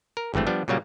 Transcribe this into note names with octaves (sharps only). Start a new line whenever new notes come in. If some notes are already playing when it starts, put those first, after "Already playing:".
A#4
G#1 G2 E3 A3 C4
F3 G3 B3 D4
A#2 C#3 F#3 G3 A#3